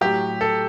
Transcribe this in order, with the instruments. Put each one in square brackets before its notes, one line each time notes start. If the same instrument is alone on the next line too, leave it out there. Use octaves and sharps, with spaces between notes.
[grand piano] A2 F#3 G4
A4